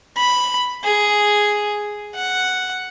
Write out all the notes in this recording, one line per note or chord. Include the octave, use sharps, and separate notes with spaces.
B5
G#4
F#5